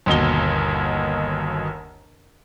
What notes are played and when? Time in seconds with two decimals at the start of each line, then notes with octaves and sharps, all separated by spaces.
0.06 G1 D#2 B2 G7